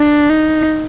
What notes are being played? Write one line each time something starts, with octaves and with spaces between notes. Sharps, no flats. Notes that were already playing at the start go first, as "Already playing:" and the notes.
Already playing: D4
D#4